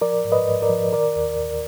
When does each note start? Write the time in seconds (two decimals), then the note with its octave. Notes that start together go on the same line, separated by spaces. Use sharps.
0.01 F3 A#4 D5
0.25 G#2
0.32 B4 D#5
0.47 G#2
0.62 A#4 D5
0.70 F3
0.93 D#3 A#4 D5
1.16 D#2
1.39 D#2